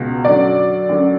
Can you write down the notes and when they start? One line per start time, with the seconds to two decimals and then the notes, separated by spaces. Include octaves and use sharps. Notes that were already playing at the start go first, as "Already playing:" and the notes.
Already playing: C#2 B2
0.25 F#2 D3 F#3 D5
0.89 F#2 D3 F#3